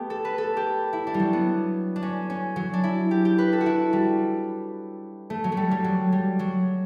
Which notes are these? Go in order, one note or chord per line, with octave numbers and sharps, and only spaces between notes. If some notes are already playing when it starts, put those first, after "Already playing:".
Already playing: A3 B3 G4
A4
B4
A4
G4
E4
D4
G3
F#3
B3
D4
C#4
C#4
F#3
D4
E4
G4
G4
B4
A4
F#4
E4
G3
A3
F#3
A3
G3
G3
F#3
G3
F#3